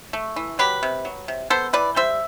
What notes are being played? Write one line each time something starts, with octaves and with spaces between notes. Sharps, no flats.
A3
E3
F#3 G4 B4
C3
F#3
C3
B3 A4 C5
E3 B4 D5
G3 C5 E5